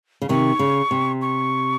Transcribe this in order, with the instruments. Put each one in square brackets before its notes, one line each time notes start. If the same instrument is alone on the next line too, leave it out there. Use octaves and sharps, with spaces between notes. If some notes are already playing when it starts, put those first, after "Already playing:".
[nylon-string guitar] C#3
[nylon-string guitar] C3 D#3 [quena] C#6
[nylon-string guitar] C#3
C3
[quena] C#6